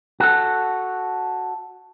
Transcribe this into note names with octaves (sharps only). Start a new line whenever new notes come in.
F#4 A4